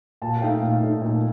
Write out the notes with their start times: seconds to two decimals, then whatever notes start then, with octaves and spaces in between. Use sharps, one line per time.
0.22 A#2 A5
0.37 F5
0.41 A3 D#4 G5
0.62 A#2 F5
0.82 A3 D#4
1.02 A#2